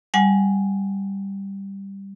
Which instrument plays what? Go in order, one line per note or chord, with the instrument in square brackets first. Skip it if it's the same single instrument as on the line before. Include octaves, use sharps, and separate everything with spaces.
[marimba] G3 F#5 G#5